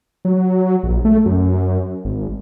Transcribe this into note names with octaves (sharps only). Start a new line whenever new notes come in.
F#3
A#1
A3
F#2
G#1